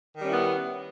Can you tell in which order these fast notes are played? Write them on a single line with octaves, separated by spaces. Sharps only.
D#3 G3 C#4 E4 B3